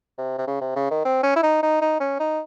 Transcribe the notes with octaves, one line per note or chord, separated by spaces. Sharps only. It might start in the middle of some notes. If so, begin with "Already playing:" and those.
C3
C3
C#3
C3
C#3
D#3
C4
C#4
E4
D#4
D#4
D#4
C#4
D#4